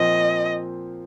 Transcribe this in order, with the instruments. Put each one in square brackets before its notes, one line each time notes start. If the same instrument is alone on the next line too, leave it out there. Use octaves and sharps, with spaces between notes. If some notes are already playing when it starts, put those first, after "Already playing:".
Already playing: [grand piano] A#2 F3 C4 [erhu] D#5